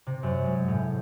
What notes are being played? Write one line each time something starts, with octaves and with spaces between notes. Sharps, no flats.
C3
F#2
G#3
A2